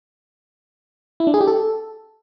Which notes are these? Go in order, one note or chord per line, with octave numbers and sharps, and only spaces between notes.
E4
D4
G#4
G4
A4